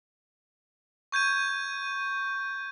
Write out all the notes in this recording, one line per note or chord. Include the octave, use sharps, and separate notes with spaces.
C#6 G6 G#6 D#7